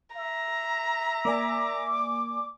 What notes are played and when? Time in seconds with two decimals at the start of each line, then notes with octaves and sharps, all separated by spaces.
0.16 E5 A#5
1.25 A#3 D5 G#5 D6